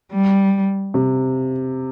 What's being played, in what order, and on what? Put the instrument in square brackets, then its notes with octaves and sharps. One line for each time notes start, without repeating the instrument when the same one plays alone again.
[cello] G3
[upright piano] C3